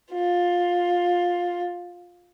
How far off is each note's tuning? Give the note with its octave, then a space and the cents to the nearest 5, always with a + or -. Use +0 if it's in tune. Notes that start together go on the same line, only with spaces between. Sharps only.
F4 +15